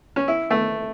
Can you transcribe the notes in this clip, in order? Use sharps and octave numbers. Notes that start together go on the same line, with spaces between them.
C#4
E4
A3